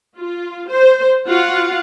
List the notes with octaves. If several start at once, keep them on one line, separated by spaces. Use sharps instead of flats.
F4
C5
F4 F#4 F5 F#5